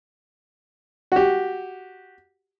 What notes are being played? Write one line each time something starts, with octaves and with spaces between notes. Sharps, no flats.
F#4 G4